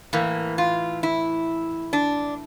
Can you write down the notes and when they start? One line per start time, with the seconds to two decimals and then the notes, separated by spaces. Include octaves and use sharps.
0.13 A2 E3 A#3
0.58 F4
1.03 E4
1.93 D4